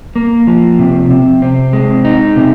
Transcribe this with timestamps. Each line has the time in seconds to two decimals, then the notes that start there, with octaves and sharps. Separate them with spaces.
0.16 A#3
0.47 F3
0.79 C3
1.11 C3
1.42 C4
1.73 G#3
2.05 D#4
2.36 C3